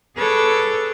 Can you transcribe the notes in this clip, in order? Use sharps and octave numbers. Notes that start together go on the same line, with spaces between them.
G#4 A4 B4 C#5 D6 E6